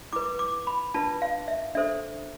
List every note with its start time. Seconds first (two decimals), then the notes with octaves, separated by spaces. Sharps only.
0.13 E4 B4 D6
0.39 D6
0.67 B5
0.94 D4 F4 B4 A5
1.22 F5
1.48 E5
1.75 D4 A4 C5 E5